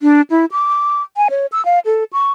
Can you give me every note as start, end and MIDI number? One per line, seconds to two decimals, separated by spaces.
0.01 0.22 62
0.30 0.45 64
0.52 1.02 86
1.17 1.28 80
1.30 1.46 73
1.52 1.64 88
1.65 1.79 77
1.85 2.04 69
2.13 2.32 85